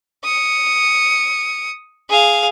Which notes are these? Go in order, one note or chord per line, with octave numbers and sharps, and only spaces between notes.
D#6 C#7
G#4 F5